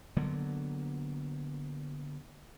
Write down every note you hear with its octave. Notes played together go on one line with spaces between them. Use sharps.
D3 F#3 A#3 B3